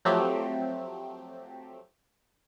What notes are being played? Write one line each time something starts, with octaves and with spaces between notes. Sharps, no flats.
F3 F#3 A3 C4 G4